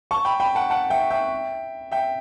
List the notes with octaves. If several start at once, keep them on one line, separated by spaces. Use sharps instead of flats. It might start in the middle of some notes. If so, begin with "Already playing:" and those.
A5 C#6
G5 B5
G5 B5
F#5 A5
F#5 A5
E5 G5
E5 G5
E5 G5